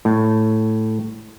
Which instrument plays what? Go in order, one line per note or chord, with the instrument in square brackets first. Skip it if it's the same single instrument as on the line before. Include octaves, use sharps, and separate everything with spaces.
[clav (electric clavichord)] A2